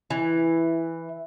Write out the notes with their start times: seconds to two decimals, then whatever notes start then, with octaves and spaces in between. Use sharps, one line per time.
0.10 E3